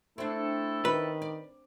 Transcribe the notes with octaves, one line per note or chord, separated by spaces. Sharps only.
A3 C4 D4 E4 A4
D#3 B4
D5